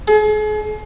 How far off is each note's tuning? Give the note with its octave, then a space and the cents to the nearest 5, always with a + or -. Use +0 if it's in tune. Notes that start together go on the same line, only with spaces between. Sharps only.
G#4 +40